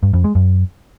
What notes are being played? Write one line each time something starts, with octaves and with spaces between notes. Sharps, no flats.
G2
F2
G#3
F#2